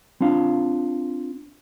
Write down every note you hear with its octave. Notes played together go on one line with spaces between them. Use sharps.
C4 D4 F4 F5